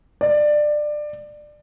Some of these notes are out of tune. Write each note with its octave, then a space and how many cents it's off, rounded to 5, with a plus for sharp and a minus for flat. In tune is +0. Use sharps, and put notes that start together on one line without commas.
D5 +20